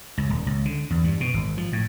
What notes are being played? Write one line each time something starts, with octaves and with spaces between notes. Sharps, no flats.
C#2
D#1
C#2
D3
E2
G2
B2
G#1
F3
A2